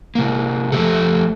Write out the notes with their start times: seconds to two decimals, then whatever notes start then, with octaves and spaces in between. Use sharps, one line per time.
0.15 C3 A#3
0.72 F3 F#3 A3 G4 A4